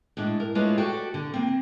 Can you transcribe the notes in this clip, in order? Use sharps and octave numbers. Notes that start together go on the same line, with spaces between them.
A2 G#3 D4
A#4
G#3 A3 D4 F4 B4 C#5
F#4 G4 A4 D5 G5
D3
A#3 C4